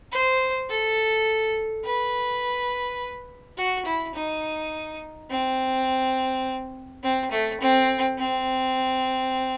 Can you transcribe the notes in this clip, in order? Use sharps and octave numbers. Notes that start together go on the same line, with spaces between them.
C5
A4
B4
F#4
E4
D#4
C4
C4
A3
C4
C4